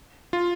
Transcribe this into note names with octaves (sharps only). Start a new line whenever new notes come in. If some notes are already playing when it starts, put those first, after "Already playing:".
F4